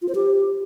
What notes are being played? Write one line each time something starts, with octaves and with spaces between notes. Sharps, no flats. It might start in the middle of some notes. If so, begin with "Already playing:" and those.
F4
C5
G4